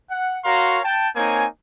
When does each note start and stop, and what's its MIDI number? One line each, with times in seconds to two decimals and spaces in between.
0.11 0.38 78
0.44 0.80 66
0.44 0.80 70
0.44 0.80 73
0.44 0.80 77
0.44 0.80 82
0.44 0.80 84
0.84 1.09 79
0.84 1.09 81
1.16 1.46 58
1.16 1.46 60
1.16 1.46 63
1.16 1.46 73
1.16 1.46 80